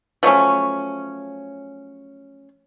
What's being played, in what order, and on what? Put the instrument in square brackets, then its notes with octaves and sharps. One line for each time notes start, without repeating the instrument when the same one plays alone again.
[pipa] F3 F#3 A3 C#4